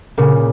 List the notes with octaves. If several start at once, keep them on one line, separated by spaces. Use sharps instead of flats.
A#2 C#3